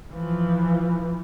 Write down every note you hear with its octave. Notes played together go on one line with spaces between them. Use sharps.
E3 F3